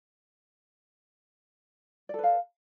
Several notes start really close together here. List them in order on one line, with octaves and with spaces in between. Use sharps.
D5 A4 B4 F5